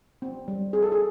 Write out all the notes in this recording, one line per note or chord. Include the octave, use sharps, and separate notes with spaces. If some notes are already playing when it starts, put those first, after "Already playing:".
C4
G3
C4 G#4
A4
G#4